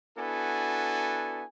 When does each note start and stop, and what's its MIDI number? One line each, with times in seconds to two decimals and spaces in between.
0.18 1.44 59
0.18 1.44 62
0.18 1.44 64
0.18 1.44 66
0.18 1.44 69
0.18 1.44 80